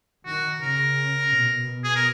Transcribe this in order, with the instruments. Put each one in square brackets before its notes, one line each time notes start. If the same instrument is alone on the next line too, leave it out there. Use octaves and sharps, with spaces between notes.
[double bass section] D#3 [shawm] F#4
[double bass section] C#3 [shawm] A#4
[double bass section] B2
[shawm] G#4
A#4